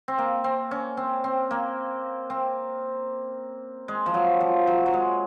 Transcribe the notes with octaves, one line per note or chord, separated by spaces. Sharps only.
C4
A#3
C4
C#4
C4
C4
A#3
C4
G#3
F3
F#3
F3
F#3
F#3
G#3